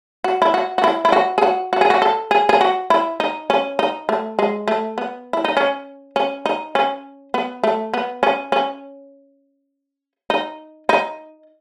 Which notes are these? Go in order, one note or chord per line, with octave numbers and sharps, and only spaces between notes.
F#4
E4
F#4
F#4
E4
E4
F#4
G#4
F#4
F#4
G#4
F#4
A4
G#4
G#4
F#4
E4
D#4
C#4
D#4
A3
G#3
A3
B3
E4
D#4
C#4
C#4
D#4
C#4
B3
A3
B3
C#4
C#4
D#4
D#4